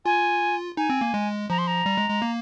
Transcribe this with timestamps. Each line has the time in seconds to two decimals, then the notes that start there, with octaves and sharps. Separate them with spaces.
0.05 F4 G#5
0.77 D#4 G#5
0.90 C4
1.01 A#3
1.14 G#3
1.50 F3 A#5
1.58 C6
1.67 A#5
1.86 G3
1.98 G#3
2.10 G#3
2.22 A#3